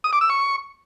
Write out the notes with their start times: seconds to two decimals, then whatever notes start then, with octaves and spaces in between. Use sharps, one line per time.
0.04 D#6
0.13 D6
0.21 E6
0.30 C#6